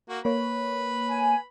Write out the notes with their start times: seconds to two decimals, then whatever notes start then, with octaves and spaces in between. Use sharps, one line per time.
0.09 A#3 F#4
0.25 A#3 B4 C#5 B5
1.08 G#5